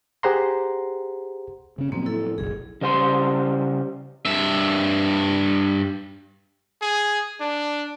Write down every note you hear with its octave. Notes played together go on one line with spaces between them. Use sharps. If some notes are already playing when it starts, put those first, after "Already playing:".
G4 G#4 C5 F#5 A#5 C6
C#3 C#4
A2 F3 F#3 A#3 C4
E4 A4
F#1 B1 G#4
C#3 G3 C5 F#5 C6
G2 E5
G#4
D4